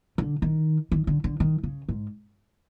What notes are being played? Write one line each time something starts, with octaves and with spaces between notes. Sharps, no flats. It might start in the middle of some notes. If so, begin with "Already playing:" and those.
D3
D#3
D#3
D3
D3
D#3
C#3
G#2